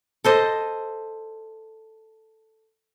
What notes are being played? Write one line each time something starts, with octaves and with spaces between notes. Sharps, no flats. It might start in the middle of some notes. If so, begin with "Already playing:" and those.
A4 C5 D#5